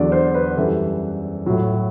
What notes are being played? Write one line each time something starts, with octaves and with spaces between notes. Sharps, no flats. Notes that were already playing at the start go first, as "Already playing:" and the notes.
Already playing: E2 D3 F#3 D5
C5
B4
F#2 E3 G3 A4
A2 F#3